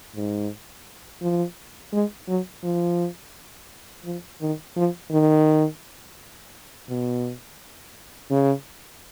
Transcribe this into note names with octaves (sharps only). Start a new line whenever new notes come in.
G#2
F3
G#3
F#3
F3
F3
D#3
F3
D#3
B2
C#3